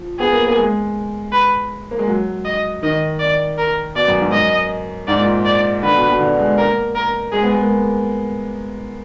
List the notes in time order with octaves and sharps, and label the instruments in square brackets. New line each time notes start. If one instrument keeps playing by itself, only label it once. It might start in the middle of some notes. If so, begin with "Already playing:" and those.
Already playing: [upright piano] F3
[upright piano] B3 [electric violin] G#4
[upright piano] A#3
A#3
G#3
[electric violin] B4
[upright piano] A#3
G#3
F#3
[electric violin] D#5
[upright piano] D#3 [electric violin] D#5
[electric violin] D5
A#4
[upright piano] B2 [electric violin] D5
[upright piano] F#2
G#2
[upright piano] F#2 [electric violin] D#5
[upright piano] G#2 [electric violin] D5
[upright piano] A#2
[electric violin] D5
[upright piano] D3 [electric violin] B4
[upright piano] B2
B2
D3
G#3
[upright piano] A#3 [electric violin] A#4
[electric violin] A#4
[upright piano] G#3 [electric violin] G#4
[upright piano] B3
G#3
A#3